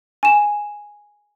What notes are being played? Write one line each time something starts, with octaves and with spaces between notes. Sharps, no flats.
G#5 E7